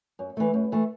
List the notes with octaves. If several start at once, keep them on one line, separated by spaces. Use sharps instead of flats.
F#2
E3 A3
F#2
E3 A3